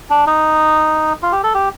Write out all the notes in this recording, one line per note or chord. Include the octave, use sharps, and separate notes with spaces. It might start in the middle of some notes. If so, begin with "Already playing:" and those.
D4
D#4
F4
G4
A4
G4